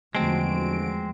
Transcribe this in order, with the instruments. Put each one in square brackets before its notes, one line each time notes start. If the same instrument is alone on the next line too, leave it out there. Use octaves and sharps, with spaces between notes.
[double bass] E2 F3 [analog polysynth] D3 F#4 D7 [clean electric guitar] G#3 C4 [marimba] A3